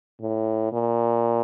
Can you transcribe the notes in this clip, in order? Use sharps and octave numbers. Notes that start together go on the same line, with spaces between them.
A2
A#2